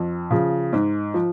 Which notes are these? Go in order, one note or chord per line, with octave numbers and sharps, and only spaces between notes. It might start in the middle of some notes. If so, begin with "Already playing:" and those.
Already playing: F2
C#3 F3
G#2
F3